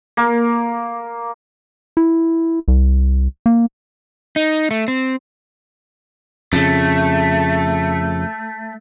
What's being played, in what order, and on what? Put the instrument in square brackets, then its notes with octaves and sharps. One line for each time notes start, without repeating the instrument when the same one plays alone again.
[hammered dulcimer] A#3
[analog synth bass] E4
C2
A#3
[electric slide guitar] D#4
A3
C4
[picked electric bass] F2 C#3 [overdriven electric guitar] A3